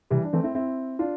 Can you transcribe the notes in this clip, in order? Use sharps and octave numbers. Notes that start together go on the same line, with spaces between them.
C3 E3 G3
D4
E3 A3 C4
C4 E4
C4 E4
D4 F4